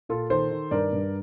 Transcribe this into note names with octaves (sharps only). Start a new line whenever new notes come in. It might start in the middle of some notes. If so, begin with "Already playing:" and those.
A#2 F4 A4
D#3 A4 C5
D#3
G2 A#4 D5
G2